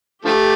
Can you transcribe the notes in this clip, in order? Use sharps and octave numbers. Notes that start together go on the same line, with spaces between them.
D3 F3 A3 G4